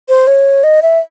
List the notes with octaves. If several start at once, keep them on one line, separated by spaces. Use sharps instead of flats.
C5
C#5
D#5
E5